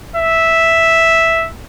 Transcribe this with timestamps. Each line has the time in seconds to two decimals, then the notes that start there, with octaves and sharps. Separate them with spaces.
0.16 E5